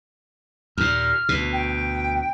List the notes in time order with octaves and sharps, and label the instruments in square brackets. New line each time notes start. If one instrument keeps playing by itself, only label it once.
[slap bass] D#2 A#2 [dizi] F6
[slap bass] D2 B2
[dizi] G5